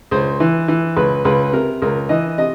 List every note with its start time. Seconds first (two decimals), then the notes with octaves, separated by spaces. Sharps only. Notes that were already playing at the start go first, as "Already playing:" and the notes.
0.11 C#2 C5
0.40 E3
0.68 E3
0.96 C#2 B4
1.25 C#2 B4
1.53 C3 A#4
1.82 C#2 A#4
2.09 E3 D#5
2.38 C3 D#5